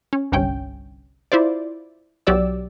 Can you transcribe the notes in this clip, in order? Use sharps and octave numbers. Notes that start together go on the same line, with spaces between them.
C#4
G1 C2 G2 C#4 G5
E4 F4 C5 D5
B1 F#3 G4 D5 E6